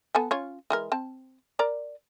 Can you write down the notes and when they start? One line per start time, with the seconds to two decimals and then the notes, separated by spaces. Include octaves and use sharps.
0.15 B3 A4 G#5
0.31 C#4 F4 C#5
0.70 E3 G#3 A#4
0.92 C4 A5
1.59 A#4 D5 A#5